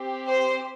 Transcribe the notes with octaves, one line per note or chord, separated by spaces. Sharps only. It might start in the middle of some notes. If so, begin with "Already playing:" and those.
Already playing: C4 G4
C5